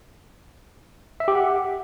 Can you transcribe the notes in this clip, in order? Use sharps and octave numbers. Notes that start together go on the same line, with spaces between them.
E5
G4
F#5